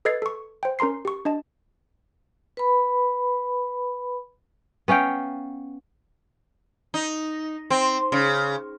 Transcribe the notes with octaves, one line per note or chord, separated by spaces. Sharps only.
A4 B4 D#5 G#6 A6 C7
A4 C#6
C5 G5
C#4 A#4 A#5 C6 C7
G4 C#6
D4 D#5 A5
B4 B5
B3 C#4 F5 G5
D#4
C4
C#3